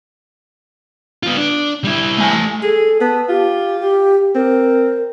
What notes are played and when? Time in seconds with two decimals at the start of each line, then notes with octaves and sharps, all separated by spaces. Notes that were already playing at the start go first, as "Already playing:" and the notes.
1.23 B3 F4
1.37 D4
1.84 G3 E4
2.18 A3 G#5
2.63 G#4 A4
3.01 B3 A5
3.29 F4 G4
3.80 G4
4.35 C4 A#4